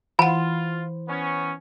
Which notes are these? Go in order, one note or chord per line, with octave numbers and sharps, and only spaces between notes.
E3 F4 C5 F5 F#5 B5
B3 C#4